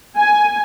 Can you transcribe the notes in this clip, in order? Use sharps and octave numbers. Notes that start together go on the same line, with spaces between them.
G#5